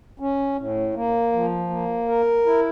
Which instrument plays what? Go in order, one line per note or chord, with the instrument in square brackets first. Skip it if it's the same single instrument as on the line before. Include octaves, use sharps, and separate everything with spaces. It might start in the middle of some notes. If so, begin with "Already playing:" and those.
[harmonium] C#4
A2
A#3
F3
A#3
A#4
E4